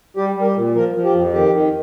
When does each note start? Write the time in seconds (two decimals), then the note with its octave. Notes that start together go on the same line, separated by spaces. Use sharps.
0.17 G3 G4
0.36 G3
0.41 A#4
0.46 G4
0.56 A#2
0.75 F3 A#4
0.95 F3
1.04 G4
1.14 F2
1.33 D#3 G4
1.53 D#3